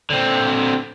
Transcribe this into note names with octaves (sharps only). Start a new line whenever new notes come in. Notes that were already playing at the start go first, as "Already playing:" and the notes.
D3 C4